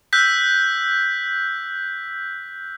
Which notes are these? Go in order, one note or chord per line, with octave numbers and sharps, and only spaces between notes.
E6 F#6 G6 B6